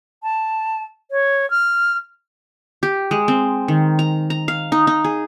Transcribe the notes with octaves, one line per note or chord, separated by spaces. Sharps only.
A5
C#5
F6
G4
G#3
C4
D#3
A#5
A#5
F5
D#4
D#4
G#4